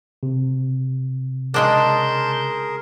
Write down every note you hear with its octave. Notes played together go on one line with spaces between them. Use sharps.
C3
C#3 G#3 D4 G#4 A#4 A5 C6 G6